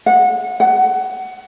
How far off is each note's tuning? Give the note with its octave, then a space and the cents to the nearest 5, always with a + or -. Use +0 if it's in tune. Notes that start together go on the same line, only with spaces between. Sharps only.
F#5 -20
F#5 +20